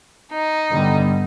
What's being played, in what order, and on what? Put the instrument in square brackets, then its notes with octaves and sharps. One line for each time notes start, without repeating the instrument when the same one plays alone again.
[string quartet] D#4
[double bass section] G2 D3 G3 B3